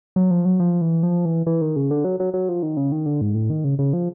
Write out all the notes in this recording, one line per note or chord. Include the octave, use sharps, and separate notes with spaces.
F#3
F3
F#3
F3
E3
F3
E3
E3
D#3
C#3
D3
F#3
F#3
F#3
F3
D#3
C#3
D#3
D3
G#2
A2
D#3
C#3
C#3
F3